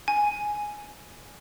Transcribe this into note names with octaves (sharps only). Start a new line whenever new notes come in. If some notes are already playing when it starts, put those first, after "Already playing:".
G#5